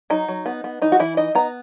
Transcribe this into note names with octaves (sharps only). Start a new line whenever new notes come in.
F#3 D#4
F#3
B3
B3
E3 D#4
F#4
E3 E4
D#4 D#5
B3 A#5